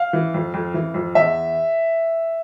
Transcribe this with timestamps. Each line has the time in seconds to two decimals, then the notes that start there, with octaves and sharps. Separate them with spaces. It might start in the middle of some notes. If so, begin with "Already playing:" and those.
Already playing: F5
0.13 E3
0.34 F2
0.54 F2
0.74 E3
0.94 F2
1.15 E2 E5